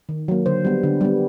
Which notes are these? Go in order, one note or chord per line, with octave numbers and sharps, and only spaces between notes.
D#3
F#3 A#3
D3 C5
G3 B3
D3
G3 B3